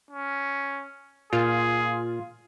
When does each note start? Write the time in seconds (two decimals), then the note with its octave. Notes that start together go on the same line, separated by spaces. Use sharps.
0.11 C#4
1.33 A#2 F4 G#4